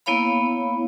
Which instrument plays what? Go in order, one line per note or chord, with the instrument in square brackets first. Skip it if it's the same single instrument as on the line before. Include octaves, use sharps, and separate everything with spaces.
[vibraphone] A#3 B3 E4 C#5 F5 B5